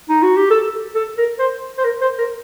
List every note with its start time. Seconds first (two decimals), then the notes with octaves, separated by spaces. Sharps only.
0.09 D#4
0.23 F#4
0.37 G4
0.50 A4
0.95 A4
1.18 A#4
1.39 C5
1.78 C5
1.84 A#4
2.01 C5
2.18 A#4